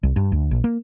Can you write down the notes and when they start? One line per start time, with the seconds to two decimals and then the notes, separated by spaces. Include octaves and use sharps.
0.03 C2
0.16 G2
0.32 D2
0.51 A#1
0.64 A#3